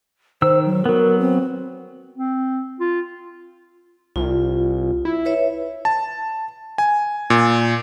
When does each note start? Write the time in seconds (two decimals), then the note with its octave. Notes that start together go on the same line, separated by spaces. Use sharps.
0.42 D#3 C5 E6
0.65 F#3
0.86 F#3 B3 A#4
1.19 C4
2.14 C4
2.80 F4
4.16 C2 F4
5.05 E4
5.25 B4 C#5 E5
5.85 A5
6.78 G#5
7.30 A#2